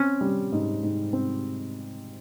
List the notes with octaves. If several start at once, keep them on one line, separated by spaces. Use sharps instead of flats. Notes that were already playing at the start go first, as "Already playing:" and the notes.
Already playing: C4 C#4
G3
G#2
G#2
C4